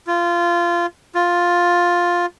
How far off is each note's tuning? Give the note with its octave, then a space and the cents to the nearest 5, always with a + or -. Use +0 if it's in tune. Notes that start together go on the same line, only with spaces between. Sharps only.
F4 -20
F4 +5